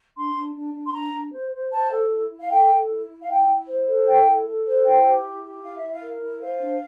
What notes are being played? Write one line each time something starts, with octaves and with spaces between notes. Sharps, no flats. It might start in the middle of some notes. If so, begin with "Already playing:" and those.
D4 C6
D4
D4
D4
C6
D4 A#5
D4
C5
C5
C5 A5
A4
E4
E4
F5
A4 G5
A4
E4
E4
F5
E4 G5
E4
C5
A4
E4 G5
A4
A4
C5
E4 G5
G4
E4
G4
E4 F5
E5
E4
F5
A#4
E4
C5 F5
D4